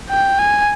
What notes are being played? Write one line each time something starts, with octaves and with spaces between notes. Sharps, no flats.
G5
G#5